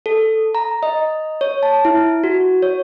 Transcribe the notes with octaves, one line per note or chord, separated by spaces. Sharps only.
A4
A#5
D#5
C#5
A5
E4
F#4
C#5